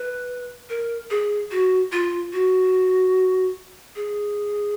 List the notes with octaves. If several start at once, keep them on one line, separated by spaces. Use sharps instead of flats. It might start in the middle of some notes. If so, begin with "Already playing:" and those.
Already playing: B4
A#4
G#4
F#4
F4
F#4
G#4